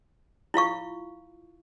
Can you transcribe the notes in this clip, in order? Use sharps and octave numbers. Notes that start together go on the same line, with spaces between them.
E4 F4 F5 C#6